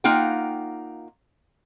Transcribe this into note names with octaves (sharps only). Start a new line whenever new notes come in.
A#3 D#4 F4 F#5 G5